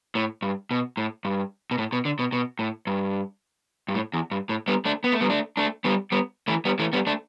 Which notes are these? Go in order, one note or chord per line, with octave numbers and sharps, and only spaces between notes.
A2
G2
B2
A2
G2
B2
A2
B2
D3
B2
B2
A2
G2
G2
A2
E2
G2
A2
G3 B3
A3 D4
B3
A3
G3 B3
A3 D4
A3 D4
G3 B3
G3 B3
E3 A3
G3 B3
E3 A3
G3 B3
A3 D4